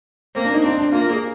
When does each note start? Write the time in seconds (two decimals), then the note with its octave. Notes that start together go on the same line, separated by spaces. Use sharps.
0.35 A#3 C4
0.45 D4
0.54 D#4
0.63 C4 D4
0.78 D4
0.92 A#3 F4
1.01 A#4
1.11 G#4